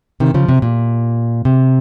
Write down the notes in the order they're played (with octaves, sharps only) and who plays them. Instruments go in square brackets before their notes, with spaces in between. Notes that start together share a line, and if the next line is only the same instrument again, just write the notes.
[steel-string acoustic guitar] C3 D#3
C#3 F3
C3
A#2
C3